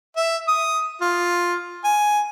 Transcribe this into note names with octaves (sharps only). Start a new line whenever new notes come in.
E5
D#6
F4
G#5